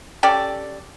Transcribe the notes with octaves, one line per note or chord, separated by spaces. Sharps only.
C#4 G4 A4 D5